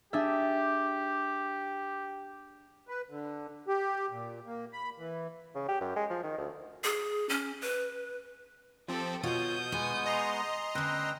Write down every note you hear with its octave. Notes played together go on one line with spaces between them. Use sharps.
D4 G4 G#4 E5
B4
D3
G4
A#2
A#3
B5
E3
C#3
G4
F#2
G#3
F3
D#3
D2
G#4
C#4
B4
F3 C4 G4 A4
B2 F4 C#5 D#6 G6
G#3 B3 G#5 C#6
D#5 A#5 C6
D2 C#4 B4 G5 E6